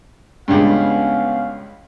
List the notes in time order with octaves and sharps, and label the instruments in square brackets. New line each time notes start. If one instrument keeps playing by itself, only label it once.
[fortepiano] C#2 G2 [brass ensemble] B3 C#4 F5